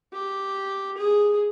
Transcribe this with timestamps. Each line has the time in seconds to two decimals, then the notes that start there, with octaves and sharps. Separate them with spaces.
0.13 G4
0.98 G#4